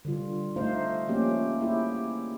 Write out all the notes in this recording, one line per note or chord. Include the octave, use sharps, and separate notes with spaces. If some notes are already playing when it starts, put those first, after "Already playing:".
D3 G3 F4
A3 D4 D#4 C5 F5
F3 A3 A#3 C#4 G4
A#3 E4 G4 G#4